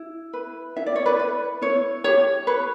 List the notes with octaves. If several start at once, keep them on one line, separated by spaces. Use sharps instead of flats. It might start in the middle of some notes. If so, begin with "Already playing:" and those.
Already playing: E4
B4
E4 E5
D5
C#5
B4 D5
B4
E4 C#5
G4 C#5
B4 C#5